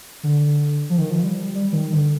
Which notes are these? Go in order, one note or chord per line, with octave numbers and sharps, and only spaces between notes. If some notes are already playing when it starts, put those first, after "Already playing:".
D3
F3
D#3
F3
G3
G3
G3
D#3
D3